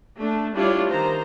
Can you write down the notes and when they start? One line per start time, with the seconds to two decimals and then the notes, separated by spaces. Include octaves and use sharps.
0.16 A3 D4
0.55 G3 D4 E4 F4 C#5 D5
0.90 D#3 C5 A#5